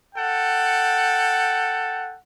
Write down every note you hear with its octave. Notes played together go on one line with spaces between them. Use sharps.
A4 F#5 G5